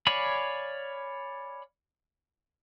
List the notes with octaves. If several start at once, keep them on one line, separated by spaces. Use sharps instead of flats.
C#5 D5 F5 G#5 B5